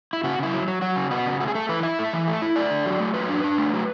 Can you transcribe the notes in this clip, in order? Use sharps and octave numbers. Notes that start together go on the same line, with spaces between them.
E4
C#3 F#4
C#3 E4
F#3
F#3
F#3 F#4
C#3
B3 F#4
C#3
A3 F#4
G#4
A3 A4
E3 B4
E4 E5
A3
E3
A3
E4
A3 D5
D3
F#3
A3
F#3 B4
D4
D4
A3
F#3